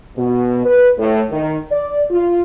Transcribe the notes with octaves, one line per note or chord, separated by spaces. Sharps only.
B2
B4
A2
D#3
D5
F4